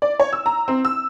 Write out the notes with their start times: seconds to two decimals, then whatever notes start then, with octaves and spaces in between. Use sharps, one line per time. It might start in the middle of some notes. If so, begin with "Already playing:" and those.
0.02 D5
0.20 C#5
0.33 E6
0.46 A#5
0.68 C4
0.85 E6